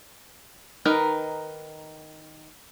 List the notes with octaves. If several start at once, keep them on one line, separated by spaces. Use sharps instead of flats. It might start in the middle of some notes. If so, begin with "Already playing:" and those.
D#3 D#4 A#4 B4